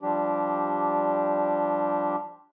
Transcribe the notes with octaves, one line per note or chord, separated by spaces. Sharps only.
F3 G3 D4 G4